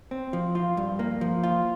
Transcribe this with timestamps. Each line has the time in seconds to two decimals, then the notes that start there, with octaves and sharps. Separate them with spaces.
0.11 C4
0.33 F3
0.55 F4
0.77 G2
0.99 A#3
1.21 F3
1.44 F4